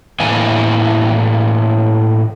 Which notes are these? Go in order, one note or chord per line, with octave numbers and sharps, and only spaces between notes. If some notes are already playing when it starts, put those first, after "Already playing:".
A2 E3 A#3 G#5